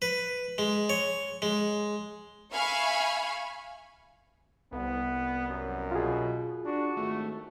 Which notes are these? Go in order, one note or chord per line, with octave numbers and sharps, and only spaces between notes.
B4
G#3
C#5
G#3
E5 F5 G#5 B5 C#6
C2 B3
F#2
B2 F4 G#4
D4 F#4
G#1 A3